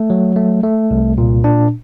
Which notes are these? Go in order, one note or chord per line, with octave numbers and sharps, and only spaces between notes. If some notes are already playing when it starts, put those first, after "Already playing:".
Already playing: A3
F#3
A3
A3
C2
A#2
D4